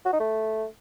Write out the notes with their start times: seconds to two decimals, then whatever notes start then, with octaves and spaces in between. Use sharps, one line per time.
0.05 F#4
0.12 D#4
0.20 A3